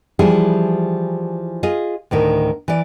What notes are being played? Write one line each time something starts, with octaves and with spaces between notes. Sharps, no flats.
E3 F3 G3 E4 G#4
F4 G#4 D#5
D2 A2 D#3
E3 D5